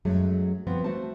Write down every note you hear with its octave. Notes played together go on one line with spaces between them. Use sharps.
F#2 F#3 G#3 A3
F3 B3 C4 F#4
A3 F#4 C5 A5